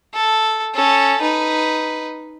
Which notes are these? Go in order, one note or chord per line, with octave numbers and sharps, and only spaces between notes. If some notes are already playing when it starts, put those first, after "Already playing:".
A4
C#4 A4
D#4 B4